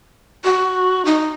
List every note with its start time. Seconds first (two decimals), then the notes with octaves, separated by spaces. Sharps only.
0.44 F#4
1.05 D#4